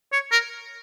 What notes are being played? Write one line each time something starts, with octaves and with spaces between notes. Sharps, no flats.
C#5
A#4